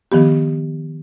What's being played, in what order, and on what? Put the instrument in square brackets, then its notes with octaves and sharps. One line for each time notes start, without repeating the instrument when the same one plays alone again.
[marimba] D#3 F3 B3 G4